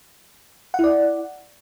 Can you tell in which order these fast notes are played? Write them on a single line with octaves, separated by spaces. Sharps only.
F#5 E4 D5